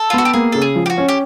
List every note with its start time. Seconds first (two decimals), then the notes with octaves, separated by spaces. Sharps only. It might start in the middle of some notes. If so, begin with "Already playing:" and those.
Already playing: A4
0.10 F4
0.13 B3
0.18 F#4
0.25 G4
0.33 A#3 G#4
0.52 C#3 A4
0.62 G#4
0.76 F3
0.86 G4
0.90 F#4
0.98 C#4
1.08 G4